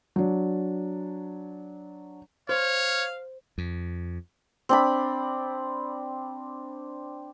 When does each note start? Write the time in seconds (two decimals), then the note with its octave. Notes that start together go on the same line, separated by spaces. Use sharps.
0.16 F#3 D4
2.49 C5 C#5 F5
3.58 F2
4.69 C4 D4 B5